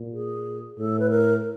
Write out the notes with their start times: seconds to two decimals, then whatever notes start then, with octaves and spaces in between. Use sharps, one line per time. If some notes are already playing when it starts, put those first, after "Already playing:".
Already playing: A#2
0.13 G#4
0.78 A2 A4
0.99 B4
1.10 A#4